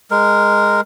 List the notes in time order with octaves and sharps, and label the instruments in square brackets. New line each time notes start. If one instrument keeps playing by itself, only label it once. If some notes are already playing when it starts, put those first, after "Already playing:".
[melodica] G#3 A#4